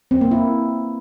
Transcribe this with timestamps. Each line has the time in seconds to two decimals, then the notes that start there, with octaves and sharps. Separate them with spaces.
0.11 C4
0.21 A#3
0.31 E4